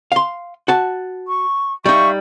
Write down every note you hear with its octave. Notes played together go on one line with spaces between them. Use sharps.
F5 C6
F#4 A5
C#6
G3 D#4 E5 F5 C#6